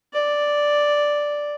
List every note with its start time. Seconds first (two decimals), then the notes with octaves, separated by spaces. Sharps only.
0.14 D5